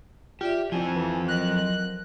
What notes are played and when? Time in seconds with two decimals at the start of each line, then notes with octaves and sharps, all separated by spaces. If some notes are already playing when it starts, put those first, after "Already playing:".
0.41 F4 G4 D5 E5
0.72 F3 C4 E4 G#5
0.95 E3
1.28 F#3 A#4 D#5 F#6